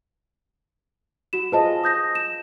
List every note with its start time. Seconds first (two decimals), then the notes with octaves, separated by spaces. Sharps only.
1.33 F#4 E7
1.52 F4 G#4 B4 C5 D#5 A5
1.84 D#6 G6 A#6
2.15 E7